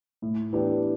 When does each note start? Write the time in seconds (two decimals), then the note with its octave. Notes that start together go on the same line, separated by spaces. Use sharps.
0.22 A2
0.53 E3 B3 D4 G4